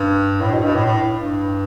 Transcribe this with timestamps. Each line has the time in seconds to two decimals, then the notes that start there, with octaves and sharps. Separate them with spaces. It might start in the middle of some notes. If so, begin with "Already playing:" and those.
Already playing: G2
0.41 A2
0.52 B2
0.64 G2
0.75 A2
0.85 A2
1.16 G2